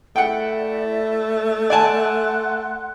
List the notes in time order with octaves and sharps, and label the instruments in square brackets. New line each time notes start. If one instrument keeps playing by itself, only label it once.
[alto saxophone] A3 [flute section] E4 D5 E5 [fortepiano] F#5 G5
[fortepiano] D5 G#5 A5 [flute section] F#5 C6 F#6